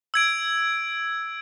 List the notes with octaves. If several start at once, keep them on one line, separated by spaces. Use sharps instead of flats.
E6 G#6 D7